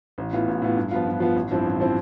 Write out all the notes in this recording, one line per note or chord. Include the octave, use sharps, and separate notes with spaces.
A1
A2 E3 B3 F4
A1
A2 E3 B3 F4
G2
F3 B3 F4
G2
F3 B3 F4
A1
G2 F3 C4 E4
A1
F3 C4 E4